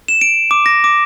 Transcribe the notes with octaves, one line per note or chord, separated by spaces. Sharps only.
E7
D7
D6
A#6
D6